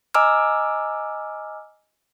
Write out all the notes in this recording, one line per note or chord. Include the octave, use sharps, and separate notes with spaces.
D#5 G#5 A#5 D6 E6 F6